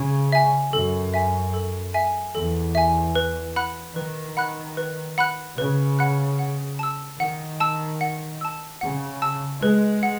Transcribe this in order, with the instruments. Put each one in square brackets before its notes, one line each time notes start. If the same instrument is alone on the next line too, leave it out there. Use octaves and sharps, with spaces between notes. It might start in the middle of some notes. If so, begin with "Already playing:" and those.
Already playing: [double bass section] C#3
[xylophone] E5 G#5
[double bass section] F#2 [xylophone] A4
[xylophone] E5 G#5
A4
E5 G#5
[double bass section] E2 [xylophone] A4
[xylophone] E5 G#5
B4
F#5 B5 F#6
[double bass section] D#3 [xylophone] B4
[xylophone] F#5 B5 F#6
B4
F#5 B5 F#6
[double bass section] C#3 [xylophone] B4
[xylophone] F#5 B5 F#6
F#5
A5 E6
[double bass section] D#3 [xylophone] F#5
[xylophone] A5 E6
F#5
A5 E6
[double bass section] C#3 [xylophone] F#5
[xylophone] A5 E6
[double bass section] G#3 [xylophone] B4
[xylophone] F#5